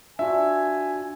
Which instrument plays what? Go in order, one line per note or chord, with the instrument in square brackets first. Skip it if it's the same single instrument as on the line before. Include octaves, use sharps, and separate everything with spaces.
[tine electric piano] D4 F4 F#4 [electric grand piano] E5 [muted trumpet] G#5